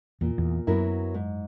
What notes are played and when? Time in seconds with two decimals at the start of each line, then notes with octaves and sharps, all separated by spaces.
0.21 E2 A#2
0.38 E2
0.67 F#2 F#3 B3 E4 A#4
1.14 G#2